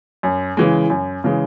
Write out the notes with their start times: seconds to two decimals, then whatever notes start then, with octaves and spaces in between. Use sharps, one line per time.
0.23 F#2
0.57 C#3 E3 G#3
0.90 F#2
1.24 C#3 E3 G#3